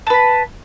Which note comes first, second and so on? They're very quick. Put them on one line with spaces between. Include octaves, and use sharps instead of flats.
A5 B4 B5